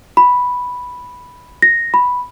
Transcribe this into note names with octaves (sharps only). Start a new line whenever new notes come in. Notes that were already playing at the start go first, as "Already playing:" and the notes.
B5
A#6
B5